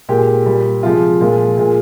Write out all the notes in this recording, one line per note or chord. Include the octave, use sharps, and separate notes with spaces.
A#2 G#3 G4
A#2 G3
C3 F3 G#3 F4
A#2 F3 G#3
A#2 G#3